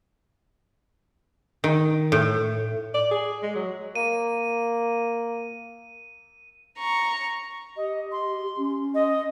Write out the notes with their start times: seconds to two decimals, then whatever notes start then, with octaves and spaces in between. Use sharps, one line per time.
1.64 D#3
2.12 A2
2.94 D5
3.11 G#4
3.42 G#3
3.55 F#3
3.95 A#3 D#7
6.78 A#5 C#6
7.77 G4 D#5
8.12 C6
8.57 C#4
8.95 D#5